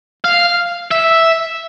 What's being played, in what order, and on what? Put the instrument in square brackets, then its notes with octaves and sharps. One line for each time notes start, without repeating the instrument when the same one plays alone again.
[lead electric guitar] F5
E5